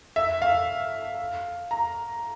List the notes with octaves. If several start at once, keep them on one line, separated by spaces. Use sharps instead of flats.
E5
F5
A#5